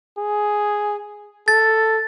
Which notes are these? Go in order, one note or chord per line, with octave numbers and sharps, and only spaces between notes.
G#4
A4 A6